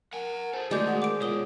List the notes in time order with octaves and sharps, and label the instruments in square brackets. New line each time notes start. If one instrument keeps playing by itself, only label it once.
[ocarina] A#4 [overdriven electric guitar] F#5 G#5
[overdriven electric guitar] G#4 A4 [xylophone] C5
[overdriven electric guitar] D#3 A3 [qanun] G#3 [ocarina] F#4 [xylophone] D5 D6 G6
[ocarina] F#5
[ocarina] A#4 [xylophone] D6 D7
[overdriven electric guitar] B2 G#3 [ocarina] F4 [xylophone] C#5 D#6 G7